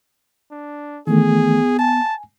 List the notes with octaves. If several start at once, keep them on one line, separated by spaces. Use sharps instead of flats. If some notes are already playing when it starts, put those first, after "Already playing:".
D4
D#3 E3 A3 B3 G#4
G#5 A5